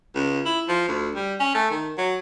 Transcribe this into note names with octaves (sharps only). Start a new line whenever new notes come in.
C#2
E4
F3
D2
G3
C#4
A3
D#3
F#3